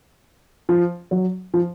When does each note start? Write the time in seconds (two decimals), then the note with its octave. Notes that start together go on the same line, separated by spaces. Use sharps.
0.69 F3
1.11 F#3
1.54 F3